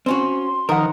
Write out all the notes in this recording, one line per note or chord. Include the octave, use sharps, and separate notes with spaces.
C4 C#4 F#4 C6
D#3 F3 A#4 F#5